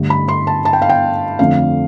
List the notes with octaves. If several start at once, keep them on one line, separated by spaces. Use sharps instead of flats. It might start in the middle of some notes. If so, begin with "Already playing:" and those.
Already playing: G2 D3 A3
B5
C6
A5
A5
G5
F5
G5
F2 D3 A3 D4 F5